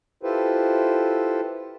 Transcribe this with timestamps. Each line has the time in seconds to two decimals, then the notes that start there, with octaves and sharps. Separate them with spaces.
0.23 E4 F4 G4 A4 B4 C5